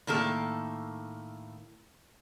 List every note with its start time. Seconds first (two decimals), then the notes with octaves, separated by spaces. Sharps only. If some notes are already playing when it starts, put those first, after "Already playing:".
0.07 A2 D#3 A#3 A4